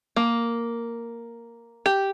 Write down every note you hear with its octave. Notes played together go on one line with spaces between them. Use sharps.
A#3
G4